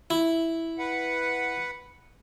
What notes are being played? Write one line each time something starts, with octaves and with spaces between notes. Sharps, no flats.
E4
B4 F#5